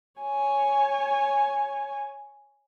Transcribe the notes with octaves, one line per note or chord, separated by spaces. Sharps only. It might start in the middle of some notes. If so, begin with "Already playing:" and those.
C#5 G#5